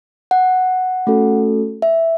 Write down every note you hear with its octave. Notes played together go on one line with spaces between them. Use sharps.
F#5
A3 C#4 F#4 A4
E5